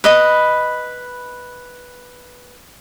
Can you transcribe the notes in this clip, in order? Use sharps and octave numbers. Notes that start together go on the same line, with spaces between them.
B4 D#5 B5